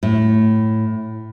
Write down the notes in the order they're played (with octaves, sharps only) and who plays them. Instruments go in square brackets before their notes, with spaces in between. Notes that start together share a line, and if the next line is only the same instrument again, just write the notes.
[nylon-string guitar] A2